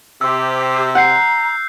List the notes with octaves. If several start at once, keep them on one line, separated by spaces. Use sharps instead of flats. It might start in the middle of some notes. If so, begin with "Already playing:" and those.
C3 G4 C5 E6
F#5 A#5 F#6 G6 C7